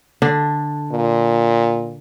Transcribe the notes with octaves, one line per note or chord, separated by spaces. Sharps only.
D3 D4
A#2